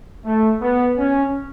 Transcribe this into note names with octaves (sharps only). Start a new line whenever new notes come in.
A3
B3
C#4